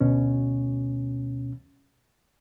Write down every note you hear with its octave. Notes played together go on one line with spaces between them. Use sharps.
D2 B2 C#4